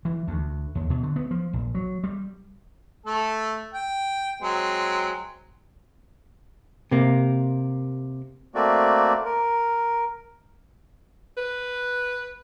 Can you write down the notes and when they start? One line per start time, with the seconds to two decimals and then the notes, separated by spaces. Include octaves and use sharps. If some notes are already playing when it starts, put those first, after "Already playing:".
0.05 E3
0.28 D2
0.75 D#2
0.90 B2
1.03 D3
1.16 B3
1.31 F3
1.53 A#1
1.75 F#3
2.04 G3
3.06 A3 A4
3.74 G5
4.42 F#3 G#3 C4
6.91 C3 A#3
8.55 A3 A#3 C4 F#4 D5
9.25 A#4
11.37 B4